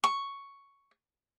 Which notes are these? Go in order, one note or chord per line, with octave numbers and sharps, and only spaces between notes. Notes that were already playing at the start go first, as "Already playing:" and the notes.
C#6